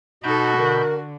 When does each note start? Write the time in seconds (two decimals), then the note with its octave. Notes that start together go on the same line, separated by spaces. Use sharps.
0.24 B2 D#4 F#4 A4 B5 G6
0.58 D3 A#4